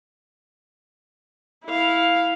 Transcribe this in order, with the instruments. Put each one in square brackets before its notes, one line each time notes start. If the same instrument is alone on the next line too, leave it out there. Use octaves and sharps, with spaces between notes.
[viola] E4 F5